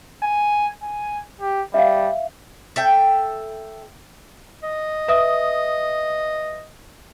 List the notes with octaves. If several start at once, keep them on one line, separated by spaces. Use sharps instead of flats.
G#5
G#5
G4
G3 E5 F5
A4 E5 G5
D#5
B4 E5 D#6